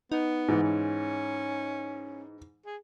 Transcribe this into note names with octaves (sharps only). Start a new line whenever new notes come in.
B3 D#4
G#2 E3
C#4
G#4